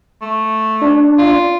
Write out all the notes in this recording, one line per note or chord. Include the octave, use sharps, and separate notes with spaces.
A3
D4
F4